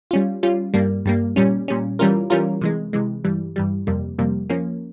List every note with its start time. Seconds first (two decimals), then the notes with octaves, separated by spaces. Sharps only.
0.11 G3 C#4 F4
0.43 G3 C#4 F4
0.74 G2 G3 A#3
1.06 G2 G3 A#3
1.36 A#2 G3 C#4
1.68 A#2 G3 C#4
1.99 E3 G3 C#4 F4 A#4
2.30 E3 G3 C#4 F4 A#4
2.61 C3 E3 G#3
2.93 C3 E3 G#3
3.24 G2 E3 G3
3.56 G2 E3 G3
3.87 F2 C3 G3 A#3
4.19 F2 C3 G3 A#3
4.50 F3 A#3 C#4